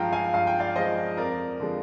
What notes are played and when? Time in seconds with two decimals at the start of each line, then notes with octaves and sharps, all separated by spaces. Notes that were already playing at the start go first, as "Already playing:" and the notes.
Already playing: G2 F3 G#3 F5 G5 A#5
0.12 F5 G#5
0.33 G2 F5
0.47 G5
0.60 D5 F5
0.75 F3 G#3 C5 D#5
1.17 F2 A#4 D5
1.60 D3 F3 G#3